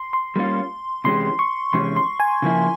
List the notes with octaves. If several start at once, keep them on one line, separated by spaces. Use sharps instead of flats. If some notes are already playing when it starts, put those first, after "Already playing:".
Already playing: C6
C6
G3 A#3 C#4 F4
C3 E3 G#3 C#4 G4 C6
C#6
C3 E3 G#3 C#4 G4 C6
C6
G#5
C#3 F3 A#3 E4